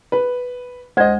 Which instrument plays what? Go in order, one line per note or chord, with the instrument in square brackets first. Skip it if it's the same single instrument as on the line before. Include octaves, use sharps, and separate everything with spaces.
[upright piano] B4
[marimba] D2 G#3 G#6 [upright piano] C5 D#5